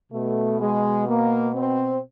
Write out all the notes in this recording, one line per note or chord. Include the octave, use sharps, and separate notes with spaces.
B2 A3
G#3
A#3
C4